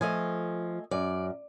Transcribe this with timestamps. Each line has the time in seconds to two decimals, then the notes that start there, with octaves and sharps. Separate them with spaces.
0.01 F3 A3 D#5 G#5
0.91 F#2 D5